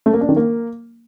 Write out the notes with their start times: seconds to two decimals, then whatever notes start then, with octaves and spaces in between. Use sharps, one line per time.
0.06 A3
0.13 A#3
0.21 D4
0.29 D#3
0.36 A#3